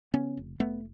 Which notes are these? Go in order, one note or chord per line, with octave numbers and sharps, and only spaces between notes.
C#3 B3 C#4
F1
F1 A3 B3